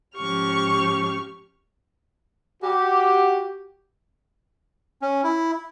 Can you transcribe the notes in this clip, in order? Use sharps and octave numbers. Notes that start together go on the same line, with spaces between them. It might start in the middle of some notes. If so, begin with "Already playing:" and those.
G#2 F3 C#4 G4 C#6 F6
F#4 G4
C#4
E4